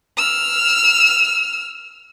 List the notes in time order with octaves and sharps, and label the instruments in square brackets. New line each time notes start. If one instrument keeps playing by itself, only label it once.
[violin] E6 F6